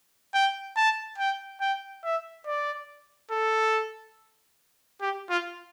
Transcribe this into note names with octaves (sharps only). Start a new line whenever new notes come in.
G5
A5
G5
G5
E5
D5
A4
G4
F4